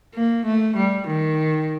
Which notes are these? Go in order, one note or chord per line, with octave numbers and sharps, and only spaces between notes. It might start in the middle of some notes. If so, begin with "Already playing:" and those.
A#3
A3
G3
D#3